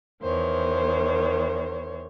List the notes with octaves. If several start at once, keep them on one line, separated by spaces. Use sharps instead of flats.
E2 D#3 C5 C#5